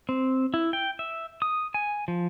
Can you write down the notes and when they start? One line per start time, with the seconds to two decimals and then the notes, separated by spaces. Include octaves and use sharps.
0.09 C4
0.54 E4
0.73 G5
0.99 E5
1.42 D#6
1.74 G#5
2.08 F3